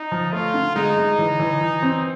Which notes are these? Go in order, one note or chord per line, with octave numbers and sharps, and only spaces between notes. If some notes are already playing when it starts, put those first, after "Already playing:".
Already playing: D#4
F3
A3 F4
D3
G#3 D#4
G#3
E3
E3
E3
C4